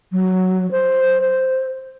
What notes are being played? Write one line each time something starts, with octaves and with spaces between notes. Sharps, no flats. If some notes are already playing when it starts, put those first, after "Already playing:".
F#3
C5
C5